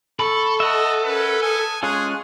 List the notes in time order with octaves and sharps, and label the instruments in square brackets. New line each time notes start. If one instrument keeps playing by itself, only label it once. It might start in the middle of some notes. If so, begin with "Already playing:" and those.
[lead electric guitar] A4 [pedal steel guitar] B5 [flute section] C#6
[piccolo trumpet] D#5 [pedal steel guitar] E5 F#5
[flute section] C#4 A#4 [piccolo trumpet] B4
[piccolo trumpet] G#5 [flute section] A5 D#6
[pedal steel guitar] G#3 C#4 F4 [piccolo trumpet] G#4 [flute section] G#5 C#6 F#6